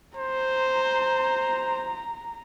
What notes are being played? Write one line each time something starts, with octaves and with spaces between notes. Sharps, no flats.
C5 A#5